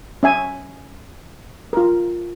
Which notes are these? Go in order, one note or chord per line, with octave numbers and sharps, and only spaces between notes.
C#4 E5 G#5
F4 A#4